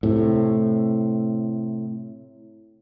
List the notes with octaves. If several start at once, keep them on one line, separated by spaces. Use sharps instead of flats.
A2 C3